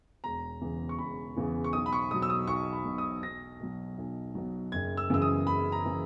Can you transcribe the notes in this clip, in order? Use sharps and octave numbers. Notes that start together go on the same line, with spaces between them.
E1 A#5
E2 C#3 E3
C#6
E1 B5
E2 C#3 E3
C#6
B1 D#6
B5
C#6
B2 F#3 D#6
E6
D#6
B1 C#6
B5
B2 F#3
D#6
B1 A#6
B2 F#3
B1
B2 F#3
F#1 G#6
E6
F#2 C#3 E3 E6
D#6
F#1 B5
A#5
C#3 E3